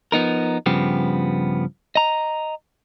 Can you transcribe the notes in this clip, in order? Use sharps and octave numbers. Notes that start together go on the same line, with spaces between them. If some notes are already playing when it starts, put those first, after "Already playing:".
F3 B3 D#4 A#4
G2 C#3 F3 B3 G4
D#5 A#5